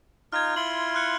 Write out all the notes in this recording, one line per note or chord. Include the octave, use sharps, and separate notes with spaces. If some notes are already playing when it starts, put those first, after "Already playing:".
D#4 F4 F6 G#6
E4 F4 C6 F#7
F6 F#6 C#7